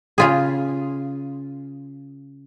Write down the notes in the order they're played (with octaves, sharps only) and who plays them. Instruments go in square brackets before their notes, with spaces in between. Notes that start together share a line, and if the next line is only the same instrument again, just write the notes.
[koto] C#3 F4 G#4